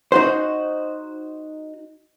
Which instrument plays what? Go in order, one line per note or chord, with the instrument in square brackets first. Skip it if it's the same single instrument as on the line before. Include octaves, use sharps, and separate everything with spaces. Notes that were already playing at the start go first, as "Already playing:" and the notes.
[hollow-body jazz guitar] D#4 F#4 C5